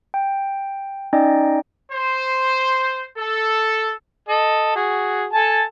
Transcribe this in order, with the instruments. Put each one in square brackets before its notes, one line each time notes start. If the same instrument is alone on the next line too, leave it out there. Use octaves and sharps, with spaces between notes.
[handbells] G5
C#4 D#4 D5 D#5 G5
[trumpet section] C5
A4
[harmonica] A4 D#5
F#4 G#4
A4 G#5 A5